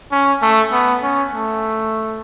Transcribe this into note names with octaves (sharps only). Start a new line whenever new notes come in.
C#4
A3
B3
C#4
A3